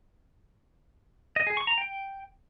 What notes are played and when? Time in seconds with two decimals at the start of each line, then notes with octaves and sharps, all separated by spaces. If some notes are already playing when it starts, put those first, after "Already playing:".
1.36 D#5
1.47 G#4
1.57 C#6
1.67 A#5
1.78 G5